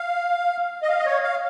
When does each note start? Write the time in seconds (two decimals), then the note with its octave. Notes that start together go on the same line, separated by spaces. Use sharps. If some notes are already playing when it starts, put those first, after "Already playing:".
Already playing: F5
0.82 D#5
0.89 F5
0.99 D#5
1.06 C#5
1.23 F5